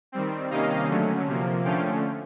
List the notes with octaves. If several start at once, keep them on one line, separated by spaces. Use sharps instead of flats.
D#3 G3 C4
C3 D#3 G3 A#3 C#4 D#5 F5
D3 F#3 A3 C#4
C3 F3 A#3
D3 F3 A3 C#4 F5 G5